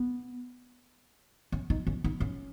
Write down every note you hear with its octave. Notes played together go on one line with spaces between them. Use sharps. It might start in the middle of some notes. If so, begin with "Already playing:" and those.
Already playing: B3
C#4
D#4
C#4
D#4
C#4